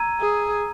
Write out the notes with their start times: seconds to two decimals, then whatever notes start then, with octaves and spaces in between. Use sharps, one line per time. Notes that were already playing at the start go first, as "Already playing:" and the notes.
Already playing: A#5 E6 G#6 D#7
0.21 G#4